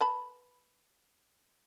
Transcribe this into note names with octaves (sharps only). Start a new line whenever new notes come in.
B4 A5 B5